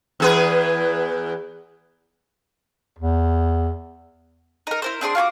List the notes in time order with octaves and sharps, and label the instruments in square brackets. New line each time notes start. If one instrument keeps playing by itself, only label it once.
[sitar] E2 G#4 B4
[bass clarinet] E2
[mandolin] D#4 A#4
E4 A#4 C5
C4 D4 G#4 C6
F4 F#4 G#5 D6